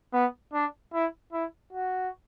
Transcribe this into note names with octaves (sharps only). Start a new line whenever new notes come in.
B3
D4
E4
E4
F#4